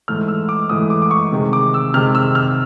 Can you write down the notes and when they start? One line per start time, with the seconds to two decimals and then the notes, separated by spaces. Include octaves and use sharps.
0.08 G#2 E3 A3 F6
0.28 E6
0.49 D6
0.69 G#2 E3 A3 D#6
0.90 D6
1.02 D6
1.11 C#6
1.32 C3 D#3 G#3
1.53 D6
1.74 E6
1.94 C3 D#3 G#3 F6
2.15 E6
2.35 F6